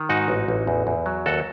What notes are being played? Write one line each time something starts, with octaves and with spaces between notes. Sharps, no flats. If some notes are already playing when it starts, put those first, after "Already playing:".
Already playing: D#3
G#2 D#4 F#4
A1
A1
E2
E2
F#3
D#2 F#4 A4